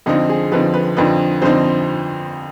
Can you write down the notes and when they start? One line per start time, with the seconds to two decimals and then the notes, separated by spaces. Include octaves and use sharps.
0.06 F2 D3 F3 C4 D#4 D#5
0.29 G#4
0.52 F2 D3 F3 C4 D#4 B4
0.74 B4
0.97 F2 D3 F3 C4 D#4 B4
1.42 F2 D3 F3 C4 D#4 C5